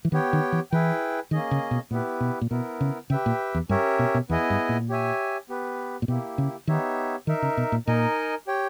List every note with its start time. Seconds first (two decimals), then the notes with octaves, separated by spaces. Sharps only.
0.05 E3
0.12 D#3 B3 G4 C#5 G5
0.33 D#3
0.52 E3
0.71 E3 E4 G#4 B4 G5
1.31 D#3 A#3 C#4 G#4 D#5
1.51 C#3
1.71 B2
1.91 A#2 B3 E4 G4 B4
2.20 B2
2.41 A#2
2.51 B2 B3 E4 A#4
2.81 C#3
3.10 C#3 G4 B4 E5 G5
3.26 A#2
3.54 E2
3.69 G2 C#4 G4 A#4 C#5 E5
3.99 B2
4.14 B2
4.29 E2 B3 E4 G#4 D#5 G#5
4.50 G2
4.69 A#2
4.89 G4 C#5 E5 G#5
5.49 B3 G4 B4
6.02 A#2
6.08 B2 A#3 E4 G4
6.38 C#3
6.67 D#3 B3 D#4 G4 C#5 E5
7.27 D#3 D#4 A#4 E5
7.42 C#3
7.57 B2
7.72 A#2
7.87 A#2 D#4 A#4 D#5 G#5
8.47 G4 C#5 G5